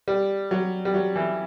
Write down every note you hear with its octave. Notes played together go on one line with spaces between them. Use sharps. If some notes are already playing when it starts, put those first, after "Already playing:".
G3
F#3
G3
F#3
E3